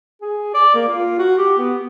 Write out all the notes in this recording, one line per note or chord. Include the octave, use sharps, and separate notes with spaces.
G#4
D5
A#3
F4
F#4
G4
B3